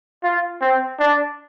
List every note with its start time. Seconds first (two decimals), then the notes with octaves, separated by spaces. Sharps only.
0.23 F4
0.61 C4
0.99 D4